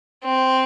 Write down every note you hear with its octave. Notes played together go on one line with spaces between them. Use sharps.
C4